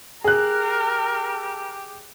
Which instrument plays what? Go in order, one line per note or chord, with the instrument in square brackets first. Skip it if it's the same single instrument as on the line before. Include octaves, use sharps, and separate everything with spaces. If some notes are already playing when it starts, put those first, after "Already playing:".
[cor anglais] G4 [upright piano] G#4 F#6 [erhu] A#4